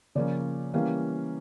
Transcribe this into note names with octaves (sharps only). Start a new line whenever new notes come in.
C#3 F3 A#3 C#4 D5
E3 G3 A#3 C#4 F5